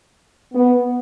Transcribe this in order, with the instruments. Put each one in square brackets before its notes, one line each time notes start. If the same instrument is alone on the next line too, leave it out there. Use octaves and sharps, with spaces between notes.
[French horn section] B3